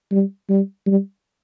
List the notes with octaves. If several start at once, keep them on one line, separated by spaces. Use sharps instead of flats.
G3
G3
G3